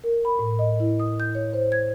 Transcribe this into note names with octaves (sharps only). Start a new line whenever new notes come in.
A#4
B5
A2
D#5
E4
D#6
G6
C#5
C5
G#6